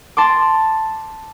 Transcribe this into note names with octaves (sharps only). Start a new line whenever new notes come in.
A5 C6 D6